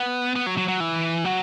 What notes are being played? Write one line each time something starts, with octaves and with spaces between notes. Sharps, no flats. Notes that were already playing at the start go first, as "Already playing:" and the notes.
Already playing: B3
B3
F#3
F#3
F#3
E3
F#3